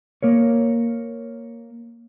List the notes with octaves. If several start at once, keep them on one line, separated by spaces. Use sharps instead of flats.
A#3 A#4 C#5